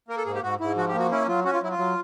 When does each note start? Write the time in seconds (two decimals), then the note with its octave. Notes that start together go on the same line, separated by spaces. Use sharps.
0.08 A#3 A#4
0.17 A4
0.26 G#2 G#4
0.35 G4
0.43 G#2 F#4
0.60 G#2 E4
0.77 F3 F#4
0.88 G4
0.94 A#3 F#4
1.11 C#4 E4
1.28 F#3 F4
1.45 C#4 F#4
1.53 F4
1.62 F#3 E4
1.71 F4
1.78 F#3